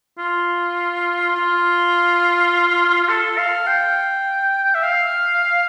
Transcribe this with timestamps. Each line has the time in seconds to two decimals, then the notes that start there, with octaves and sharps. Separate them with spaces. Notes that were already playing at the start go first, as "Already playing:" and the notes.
0.19 F4
1.35 F4
3.09 A4
3.38 F5
3.67 G5
4.75 E5
4.83 F5